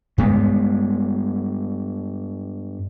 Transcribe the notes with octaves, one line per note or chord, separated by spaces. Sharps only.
G2 G#3 B3